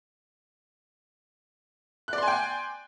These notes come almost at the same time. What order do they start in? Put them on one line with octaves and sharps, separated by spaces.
F#6 D5 C6 G#5 G5